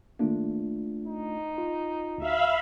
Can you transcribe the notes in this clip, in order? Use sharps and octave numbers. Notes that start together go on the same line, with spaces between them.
D#3 A3 A#3 D4 F4
D#4
F4
D2 F#4 E5 F5 B5